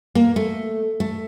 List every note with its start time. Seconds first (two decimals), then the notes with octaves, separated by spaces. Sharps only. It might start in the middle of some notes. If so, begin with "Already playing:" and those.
0.15 A#3
0.36 A3
1.00 A3